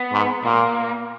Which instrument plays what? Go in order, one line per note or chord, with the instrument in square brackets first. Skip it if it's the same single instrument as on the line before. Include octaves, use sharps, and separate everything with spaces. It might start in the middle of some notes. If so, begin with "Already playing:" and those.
Already playing: [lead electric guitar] B3
[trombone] G#2
[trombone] A#2 [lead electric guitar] A#3